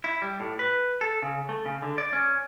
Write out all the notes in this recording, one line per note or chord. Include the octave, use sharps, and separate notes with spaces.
E4
G3
A2
B4
A4
C#3
A3
C#3
D3
D5
C#4